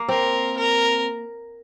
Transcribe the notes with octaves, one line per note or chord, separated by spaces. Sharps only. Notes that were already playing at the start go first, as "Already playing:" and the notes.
Already playing: A#3
C4 A#4
A#4